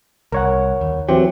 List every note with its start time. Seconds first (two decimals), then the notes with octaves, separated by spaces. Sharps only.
0.32 C2 A#4 C#5 F#5
0.81 D#2
1.09 E3 F#3 C4 G4